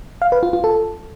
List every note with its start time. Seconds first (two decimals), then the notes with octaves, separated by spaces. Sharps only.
0.22 F5
0.32 B4
0.43 F4
0.53 F4
0.64 A4